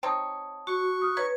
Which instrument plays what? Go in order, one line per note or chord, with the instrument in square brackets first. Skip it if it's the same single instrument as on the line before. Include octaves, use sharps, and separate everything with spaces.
[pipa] C4 D#4 C#5 [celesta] G5 A5 D#6
[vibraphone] F#4 [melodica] C#6
[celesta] D#6 F6 F#6
[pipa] D#4 [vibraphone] B4 [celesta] C#5 G#6